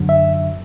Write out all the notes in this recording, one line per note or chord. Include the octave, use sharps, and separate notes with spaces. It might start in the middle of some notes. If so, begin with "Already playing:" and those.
Already playing: F#2 D3 F#3
E5